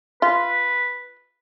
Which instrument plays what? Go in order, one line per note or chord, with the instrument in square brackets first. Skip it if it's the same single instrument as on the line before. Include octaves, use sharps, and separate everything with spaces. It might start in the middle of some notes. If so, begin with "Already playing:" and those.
[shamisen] F4 [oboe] B4